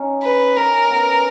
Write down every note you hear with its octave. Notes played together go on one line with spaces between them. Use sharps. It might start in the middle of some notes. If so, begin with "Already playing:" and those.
Already playing: C#4 D#4
B4
C#4 A#4
B3